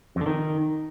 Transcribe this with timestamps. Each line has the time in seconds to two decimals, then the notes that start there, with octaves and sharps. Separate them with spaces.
0.16 F2
0.21 D3
0.26 D#3